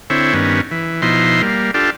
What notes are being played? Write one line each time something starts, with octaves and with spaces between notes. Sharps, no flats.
D3 C4 E4 C#5
G2 D#3 B3 C#4
E3
B2 F3 D#4 E4 C6
G3 A#3
D4 F4 G4 A4